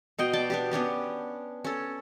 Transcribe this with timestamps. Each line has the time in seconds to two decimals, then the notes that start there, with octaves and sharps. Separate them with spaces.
0.18 B2 D#5 G5
0.33 D5 G5 A5
0.50 B3 D4 G4
0.71 B3 C#4 D4 G4
1.64 C#4 A4